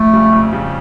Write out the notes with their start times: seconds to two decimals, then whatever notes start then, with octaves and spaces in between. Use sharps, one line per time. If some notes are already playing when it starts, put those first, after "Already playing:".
Already playing: F2 A3
0.13 C#3 G3
0.33 F2
0.52 C#3 G3